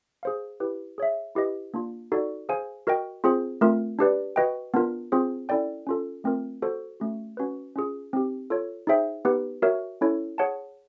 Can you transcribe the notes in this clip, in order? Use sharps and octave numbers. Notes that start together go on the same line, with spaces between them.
G#4 C5 F5
E4 G4 B4
G#4 C#5 E5
E4 G4 B4 D#5
A#3 D4 F4
D#4 F#4 A4 D5
G#4 C5 F5 G#5
F#4 A#4 D#5 G5
C4 F4 G#4 C5
A3 C4 F4 A#4
D4 G4 B4 D5
F#4 B4 D#5 G5
B3 D4 F4 A#4
C4 F4 G#4 C5
C#4 E4 A4 D5 G5
C#4 F4 A4
A3 C4 F4 A#4
F#4 A4 C5
A3 C#4 F#4
C#4 F#4 B4
C#4 F4 G#4
C4 D#4 G4
F4 A4 C#5
D#4 G#4 C5 E5 G5
B3 D#4 G4 B4
F#4 A#4 C#5 E5
C#4 E4 A4 C#5
G#4 C#5 F#5 A5